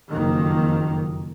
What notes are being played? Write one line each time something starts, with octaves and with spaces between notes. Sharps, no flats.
F#1 F2 D#3 A#3